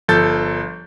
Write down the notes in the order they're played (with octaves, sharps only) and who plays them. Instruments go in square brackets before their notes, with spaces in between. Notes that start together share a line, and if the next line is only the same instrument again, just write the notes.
[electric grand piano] G1 F3 A4 G6 A6